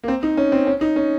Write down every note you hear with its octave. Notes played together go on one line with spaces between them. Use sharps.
A#3
C4
D#4
C#4
C4
C#4
D#4
C#4